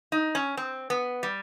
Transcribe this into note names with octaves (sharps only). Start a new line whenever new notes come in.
D#4
C#4
C4
B3
G3